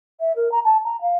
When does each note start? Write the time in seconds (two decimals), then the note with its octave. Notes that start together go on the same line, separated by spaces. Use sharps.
0.20 E5
0.36 A#4
0.51 A#5
0.64 A5
0.84 A#5
1.01 F5